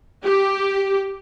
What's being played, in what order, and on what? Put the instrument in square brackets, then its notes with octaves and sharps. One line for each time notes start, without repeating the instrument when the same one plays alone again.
[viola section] G4